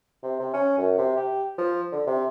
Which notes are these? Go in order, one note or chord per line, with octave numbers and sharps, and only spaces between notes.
C3
C3
C#4
F#2
C3
G4
F3
D3
C3